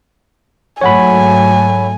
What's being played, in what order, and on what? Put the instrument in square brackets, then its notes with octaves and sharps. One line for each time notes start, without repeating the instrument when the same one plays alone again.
[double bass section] G#2 F#3 A3 [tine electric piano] C#5 F#5 B5 [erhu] G#5